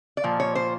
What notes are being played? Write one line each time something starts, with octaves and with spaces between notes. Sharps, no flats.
D5
A#2 F3
C#5
C5